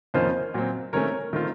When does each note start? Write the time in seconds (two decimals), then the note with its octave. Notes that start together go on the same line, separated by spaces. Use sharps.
0.14 F2 D#3 A#3 C#4 F4 C5 D#5
0.54 A#2 F#3 C4
0.92 C3 D#3 A3 C#4 A#4 C#5
1.33 D#3 A3 C4 F4